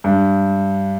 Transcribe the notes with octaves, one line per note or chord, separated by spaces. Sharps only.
G2